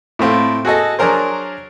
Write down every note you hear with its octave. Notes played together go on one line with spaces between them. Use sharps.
A2 A3 C4 F4
F#4 G#4 A4 D#5
F#3 D4 G#4 A#4 C5